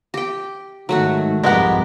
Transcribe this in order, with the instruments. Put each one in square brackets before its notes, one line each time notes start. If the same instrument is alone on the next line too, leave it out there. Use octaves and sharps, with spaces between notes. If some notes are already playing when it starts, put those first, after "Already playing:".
[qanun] G4 G5
[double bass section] G#2 D#3 [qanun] F#3 A3 F#4
[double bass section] C2 F2 G#2 [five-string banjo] G#3 B3 F#5 [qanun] G4 A#4